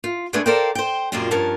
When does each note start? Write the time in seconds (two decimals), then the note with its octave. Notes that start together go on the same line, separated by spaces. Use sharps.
0.04 F4
0.33 G#3 A3 B3 D4 G#4 B4
0.46 A4 A#4 C5 D5 F5 G5
0.75 C5 G5
1.12 F#2 A#2 G3 G#3 C4 F4
1.31 G2 F3 C#4 A#4 A5